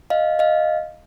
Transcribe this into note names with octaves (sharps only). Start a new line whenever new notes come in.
D#5 F5
D#5 F5